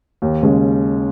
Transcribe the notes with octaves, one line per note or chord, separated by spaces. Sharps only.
D#2
C#3 G#3